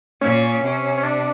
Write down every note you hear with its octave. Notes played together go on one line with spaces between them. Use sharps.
A#2 C#4
C3
C#4
D4